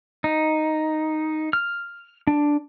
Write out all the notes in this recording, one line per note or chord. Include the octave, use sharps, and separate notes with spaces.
D#4
F6
D4